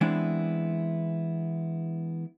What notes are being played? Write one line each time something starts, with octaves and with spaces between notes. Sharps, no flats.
E3 G#3 B3 C4 D4 E4